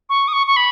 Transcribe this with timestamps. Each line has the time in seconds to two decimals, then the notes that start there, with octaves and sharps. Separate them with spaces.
0.09 C#6
0.28 D#6
0.33 C#6
0.47 C#6
0.56 B5